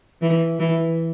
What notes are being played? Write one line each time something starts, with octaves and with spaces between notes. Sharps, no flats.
E3
E3